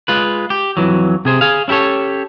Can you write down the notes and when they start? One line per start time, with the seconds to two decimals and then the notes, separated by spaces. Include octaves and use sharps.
0.08 G#3 F4 B4
0.50 G4
0.77 F2 A2 E3 F#3
1.25 C3 G#4 C5
1.41 G#4 F5
1.68 C#4 E4 G4 A4 C#5